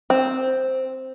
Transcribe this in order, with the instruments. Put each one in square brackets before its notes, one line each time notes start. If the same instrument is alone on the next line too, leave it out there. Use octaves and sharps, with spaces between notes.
[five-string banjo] C4